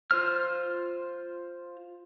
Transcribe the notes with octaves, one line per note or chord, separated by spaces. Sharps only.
F4 C5 F6